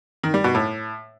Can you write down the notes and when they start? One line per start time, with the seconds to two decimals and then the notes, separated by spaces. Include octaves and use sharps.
0.23 D#3
0.34 G3
0.44 B2
0.55 A2